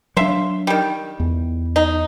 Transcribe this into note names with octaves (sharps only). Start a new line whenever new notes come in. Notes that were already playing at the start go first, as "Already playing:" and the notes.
F#3 D4 E5 F5 C6
D#3 G3
E2
D#4